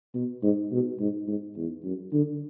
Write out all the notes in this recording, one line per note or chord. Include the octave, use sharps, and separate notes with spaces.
B2
G#2
B2
G#2
G#2
E2
F#2
D3